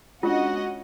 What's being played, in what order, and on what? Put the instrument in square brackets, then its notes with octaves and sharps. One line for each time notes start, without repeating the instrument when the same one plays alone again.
[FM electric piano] G#3 D4 [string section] C#4 D#5 F#5 [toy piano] F4 [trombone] F#4